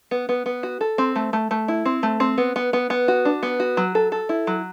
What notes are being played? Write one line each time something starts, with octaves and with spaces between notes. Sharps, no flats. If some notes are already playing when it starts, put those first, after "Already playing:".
B3
B3
B3
F#4
A4
C4
A3
A3
A3
E4
C4
A3
C4
B3
B3
B3
B3
F#4
D4
B3
F#4
F#3
A4
A4
E4
F#3